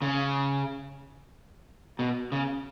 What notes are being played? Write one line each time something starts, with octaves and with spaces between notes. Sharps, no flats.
C#3
B2
C#3